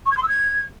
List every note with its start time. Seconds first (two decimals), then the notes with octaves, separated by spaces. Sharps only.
0.05 C#6
0.11 G#6
0.17 C6
0.22 E6
0.28 G#6